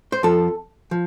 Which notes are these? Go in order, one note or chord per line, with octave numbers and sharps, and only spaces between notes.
C5
F2 F3 A4
F3